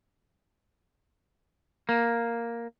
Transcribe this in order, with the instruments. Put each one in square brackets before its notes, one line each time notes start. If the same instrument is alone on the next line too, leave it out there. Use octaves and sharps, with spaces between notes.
[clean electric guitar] A#3